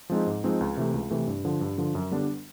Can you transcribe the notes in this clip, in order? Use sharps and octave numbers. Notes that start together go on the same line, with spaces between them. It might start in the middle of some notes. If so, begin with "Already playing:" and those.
F3 G#3 C4 D#4
G#2
F3 G#3 C4 D#4
C#2
C3 E3 A3
C#2
C3 E3 A3
G2
D3 F3
G2
D3 F3
F#2
D3 G3 B3 D4